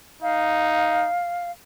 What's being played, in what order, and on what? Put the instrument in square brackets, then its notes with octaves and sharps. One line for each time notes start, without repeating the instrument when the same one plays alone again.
[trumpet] D#4 [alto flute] F5